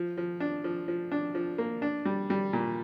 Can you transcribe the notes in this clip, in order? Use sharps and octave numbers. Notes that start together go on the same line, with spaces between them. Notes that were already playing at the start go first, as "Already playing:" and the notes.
Already playing: F3
F3
D4
F3
F3
D4
F3
A#3
D4
G3
G3
A#2